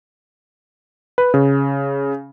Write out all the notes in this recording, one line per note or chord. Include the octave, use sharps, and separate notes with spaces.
B4
C#3